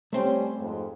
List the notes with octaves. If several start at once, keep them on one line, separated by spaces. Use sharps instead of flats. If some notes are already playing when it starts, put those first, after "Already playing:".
G3 A3 C4 C#4 C5
F2 G#2